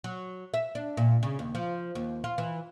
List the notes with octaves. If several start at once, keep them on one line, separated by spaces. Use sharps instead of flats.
F#3
E5
D4
A#2
C#3
D#2
F3
D#2
F4
E3